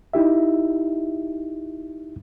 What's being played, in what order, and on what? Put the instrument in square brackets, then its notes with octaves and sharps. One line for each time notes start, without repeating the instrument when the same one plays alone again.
[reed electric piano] D#4 E4 G4 E5